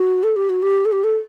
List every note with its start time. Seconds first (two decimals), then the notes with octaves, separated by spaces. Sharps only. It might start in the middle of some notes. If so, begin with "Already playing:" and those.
Already playing: F#4
0.23 A4
0.36 G4
0.49 F#4
0.62 G4
0.85 A4
0.92 G4
1.04 A4